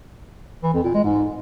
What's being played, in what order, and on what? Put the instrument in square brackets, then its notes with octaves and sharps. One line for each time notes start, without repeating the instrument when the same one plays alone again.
[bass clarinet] E3
F2
A#2
G#3
G#2